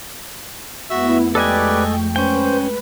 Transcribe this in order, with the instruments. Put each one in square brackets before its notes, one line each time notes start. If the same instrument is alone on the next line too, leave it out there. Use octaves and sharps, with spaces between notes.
[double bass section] F2 G#3 A3 [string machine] B3 E4 [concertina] F#4 E5 E6
[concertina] G4 B4 D5 [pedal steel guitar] A4 D#5 G#5 [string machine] G5 C#6
[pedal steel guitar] C#4 G5 [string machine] B4 [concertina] C5